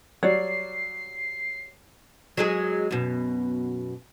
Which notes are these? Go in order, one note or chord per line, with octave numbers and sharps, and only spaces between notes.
F#3 G3 C#5 D5 C7
F#3 G#3 G#4
F#2 B2